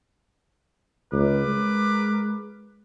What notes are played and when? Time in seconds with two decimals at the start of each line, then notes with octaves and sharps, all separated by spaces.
1.12 C#2 A#4 B4 D6
1.47 G#3